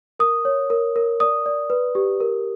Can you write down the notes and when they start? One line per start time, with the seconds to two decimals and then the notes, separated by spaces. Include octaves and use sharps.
0.19 A#4 D#6
0.45 C#5
0.70 A#4
0.96 A#4
1.20 D5 D#6
1.46 D5
1.70 B4
1.95 G4
2.20 A#4